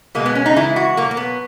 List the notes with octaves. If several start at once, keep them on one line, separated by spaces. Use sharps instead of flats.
B2 G#3 A#3
B3
C#4
D#4
C#3 E3 G#3 E4
F#4
B2 F#3 A#3
A#3
B3